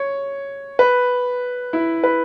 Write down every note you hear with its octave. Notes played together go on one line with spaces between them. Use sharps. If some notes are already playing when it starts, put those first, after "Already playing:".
Already playing: C#5
B4
E4
B4